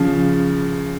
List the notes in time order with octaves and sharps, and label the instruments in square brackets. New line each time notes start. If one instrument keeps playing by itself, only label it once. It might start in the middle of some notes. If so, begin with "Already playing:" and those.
Already playing: [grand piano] C#3 F3